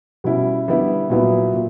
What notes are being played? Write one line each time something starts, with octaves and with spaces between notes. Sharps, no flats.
B2 G3 C#4 E4
D3 G3 B3 E4
A#2 F#3 B3 E4
A#2